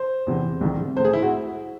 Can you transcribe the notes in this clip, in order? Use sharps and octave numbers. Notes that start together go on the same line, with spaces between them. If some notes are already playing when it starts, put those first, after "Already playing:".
Already playing: C5
E2 C3 E3
C2 C3 D#3
A2 G#3 C4 C5
G#4
E4
F#4